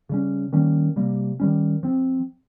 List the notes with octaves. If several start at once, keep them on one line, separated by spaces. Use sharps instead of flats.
C#3 G3 C#4
D#3 G3 A#3 C#4
C3 G3 A#3
D#3 G3 C#4
F3 C4